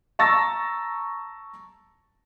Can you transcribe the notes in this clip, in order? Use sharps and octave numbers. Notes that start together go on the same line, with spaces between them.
A5 A#5 C#6 E6 A6 A#6